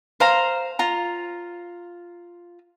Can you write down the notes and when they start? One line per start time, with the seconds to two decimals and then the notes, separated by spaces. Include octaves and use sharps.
0.20 C5 F5 A#5
0.79 F4 A#5